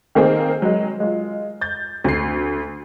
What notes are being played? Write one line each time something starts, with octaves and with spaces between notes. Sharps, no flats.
D#3 A#3 C4 G#4
F#3 G#3
G#3 F4
G6 A6
D2 C7